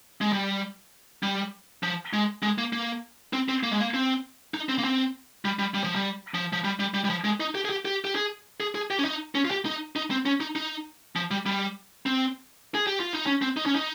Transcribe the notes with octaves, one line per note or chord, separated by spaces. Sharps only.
G#3
G3
G3
F3
G#3
G#3
A#3
A#3
C4
C4
A#3
G#3
A#3
C4
D#4
C4
A#3
C4
G3
G3
G3
F3
G3
F3
F3
G3
G3
G3
G3
F3
G#3
D#4
G4
G#4
G4
G4
G4
G#4
G#4
G#4
G4
C#4
D#4
C#4
F4
G4
D#4
D#4
C4
C#4
D#4
D#4
F3
G3
G3
C4
G#4
G4
F4
D#4
C#4
C4
D#4
C#4
D#4